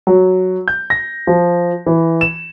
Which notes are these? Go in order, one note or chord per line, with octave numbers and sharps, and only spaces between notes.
F#3
G6
A#6
F3
E3
E7